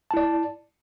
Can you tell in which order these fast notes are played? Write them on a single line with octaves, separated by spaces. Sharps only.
A5 E4 D5